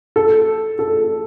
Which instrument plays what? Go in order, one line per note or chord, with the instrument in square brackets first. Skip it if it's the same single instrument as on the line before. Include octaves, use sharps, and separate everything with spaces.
[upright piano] A4
A4